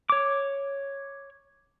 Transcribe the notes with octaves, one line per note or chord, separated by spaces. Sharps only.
C#5 D6